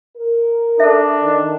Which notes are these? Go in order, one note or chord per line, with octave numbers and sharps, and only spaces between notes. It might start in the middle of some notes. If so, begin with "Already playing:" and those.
A#4
D4 A4 E5
D#3